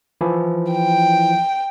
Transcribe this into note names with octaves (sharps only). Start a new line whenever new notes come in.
E3 F3 E4
G5